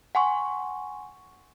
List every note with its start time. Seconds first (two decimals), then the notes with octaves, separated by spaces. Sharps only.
0.15 F#5 G#5 C6 C#6